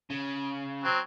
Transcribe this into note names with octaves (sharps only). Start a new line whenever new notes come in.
C#3
F#3 C4